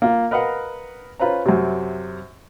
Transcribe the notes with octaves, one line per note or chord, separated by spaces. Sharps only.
A#3 F4
A#4 B4 D#5 F5 F#5
C#4 F4 B4 C5 A#5
F#2 C3